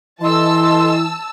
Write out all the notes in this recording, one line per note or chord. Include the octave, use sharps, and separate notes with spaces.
E3 E4 A4 D#5 A5 C6 E6